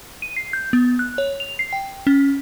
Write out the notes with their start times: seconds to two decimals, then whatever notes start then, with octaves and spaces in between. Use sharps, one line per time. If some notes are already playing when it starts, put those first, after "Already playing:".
0.22 D#7
0.37 C7
0.53 G6
0.73 B3
0.99 F#6
1.18 C#5
1.40 F7
1.59 C7
1.73 G5
2.07 C#4